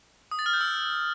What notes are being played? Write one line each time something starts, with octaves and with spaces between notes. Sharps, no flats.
D#6
A6
F6
G6
E6